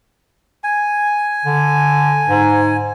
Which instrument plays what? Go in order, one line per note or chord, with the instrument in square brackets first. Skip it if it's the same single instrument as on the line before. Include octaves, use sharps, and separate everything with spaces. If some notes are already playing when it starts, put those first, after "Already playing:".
[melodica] G#5
[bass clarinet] D3
G#2